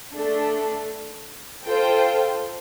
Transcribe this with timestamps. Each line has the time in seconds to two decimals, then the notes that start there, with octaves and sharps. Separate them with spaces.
0.14 A3 D4 A4
1.64 F4 A4 C5 G5